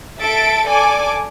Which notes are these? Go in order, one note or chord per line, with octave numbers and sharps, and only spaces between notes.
A4 E5 A6 D7
A4 D5 G#5 D6